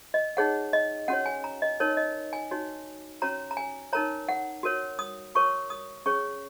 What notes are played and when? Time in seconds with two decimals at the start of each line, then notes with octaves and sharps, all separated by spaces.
0.14 D#5
0.37 D#4 G#4 C#5 F#5
0.73 D#5
1.08 C#4 F#4 C#5 F#5
1.26 G#5
1.44 A#5
1.62 D#5
1.80 D#4 A#4 C#5
1.97 D#5
2.33 G#5
2.51 D#4 F#4 C#5
3.22 C#4 F#4 C#5 A#5
3.51 A#5
3.57 G#5
3.93 D#4 A#4 C#5 A#5
4.29 F#5
4.63 F#4 A#4 C#5
4.99 D#6
5.35 F#4 A#4 C#5 C#6
5.70 D#6
6.06 C#4 G#4 C#5 C#6